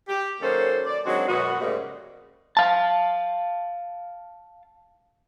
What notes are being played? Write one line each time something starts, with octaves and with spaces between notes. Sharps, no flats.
G4
D#3 F#3 A#3 C#4 A4 C5
D5
D#3 F#3 G#3 C4 D4 F#4
F#2 B2 G#3 B3 F#4
G#2 C#3 G3 A3 A#3
F5 A5